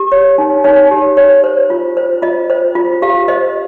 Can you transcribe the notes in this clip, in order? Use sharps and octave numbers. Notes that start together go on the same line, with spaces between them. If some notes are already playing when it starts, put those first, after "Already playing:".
Already playing: G4
C#5
D#4
D#4 C#5
G4
C#5
C5
F4
C5
F4 D#5
C5
F4
G4 F5
C5 D#5